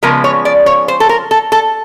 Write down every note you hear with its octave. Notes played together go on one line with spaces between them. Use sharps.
C#3 F3 G#3 B3 A#4
C#5
D5
C#5
C5
A4
A#4
A4
A4